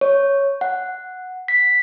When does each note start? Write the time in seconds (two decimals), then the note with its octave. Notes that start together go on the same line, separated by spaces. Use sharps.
0.01 C#5
0.61 F#5
1.48 B6